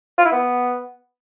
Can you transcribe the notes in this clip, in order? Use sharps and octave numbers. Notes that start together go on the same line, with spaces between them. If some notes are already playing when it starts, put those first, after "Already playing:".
F4
E4
B3